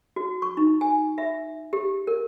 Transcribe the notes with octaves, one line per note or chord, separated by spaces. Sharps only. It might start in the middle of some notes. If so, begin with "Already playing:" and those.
F#4
C#6
D#4
G#5
E5
G4
A#4